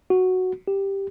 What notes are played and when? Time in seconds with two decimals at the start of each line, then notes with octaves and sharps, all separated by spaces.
0.10 F#4
0.68 G4